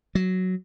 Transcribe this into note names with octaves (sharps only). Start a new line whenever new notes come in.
F#3